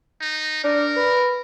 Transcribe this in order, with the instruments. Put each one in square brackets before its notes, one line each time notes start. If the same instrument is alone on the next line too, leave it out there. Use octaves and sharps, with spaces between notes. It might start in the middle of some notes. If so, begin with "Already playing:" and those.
[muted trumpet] D#4
[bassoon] D4 [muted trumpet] A#4
[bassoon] B4